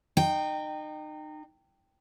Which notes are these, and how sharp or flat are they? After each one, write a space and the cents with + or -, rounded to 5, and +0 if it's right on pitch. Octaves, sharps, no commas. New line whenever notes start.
D#4 -30 G5 +0